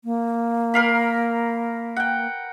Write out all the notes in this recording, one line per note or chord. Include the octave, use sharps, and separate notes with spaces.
A#3
A#4 F5 B5
F#5 G5